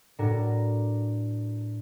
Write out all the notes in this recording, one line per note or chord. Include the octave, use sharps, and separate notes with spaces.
A2 D4 F#4 A#4 A#5